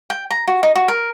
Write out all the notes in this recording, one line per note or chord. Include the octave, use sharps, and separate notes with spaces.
G5
A#5
F#4
D#4
F#4
A#4